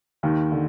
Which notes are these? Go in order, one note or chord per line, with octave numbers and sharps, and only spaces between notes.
D#2 D#3
D3